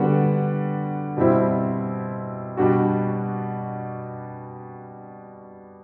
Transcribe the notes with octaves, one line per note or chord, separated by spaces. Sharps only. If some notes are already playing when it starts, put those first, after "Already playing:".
Already playing: D3 G3 B3 D4 F#4
B2 G3 C4 E4
B2 G3 D4 F#4